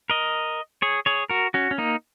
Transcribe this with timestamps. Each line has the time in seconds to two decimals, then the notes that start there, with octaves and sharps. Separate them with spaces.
0.10 A#4 D#5
0.82 G#4 C#5
1.06 G#4 C#5
1.30 F#4 A#4
1.54 C#4 F#4
1.71 C#4
1.78 A#3 D#4